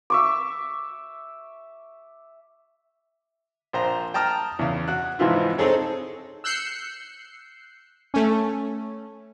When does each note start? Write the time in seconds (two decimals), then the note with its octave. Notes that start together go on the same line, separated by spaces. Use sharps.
0.10 E5 C#6 D6
3.73 A#1 C5 A#5
4.14 G5 A5 A#5 D#6 F6
4.59 E2 C#3
4.88 F#4 F#6
5.19 G#2 C3 E3 F3 E4 F4
5.58 C4 D#4 G#4 A4 C#5
6.44 E6 F#6 G6 C7 C#7
8.14 A3 C#4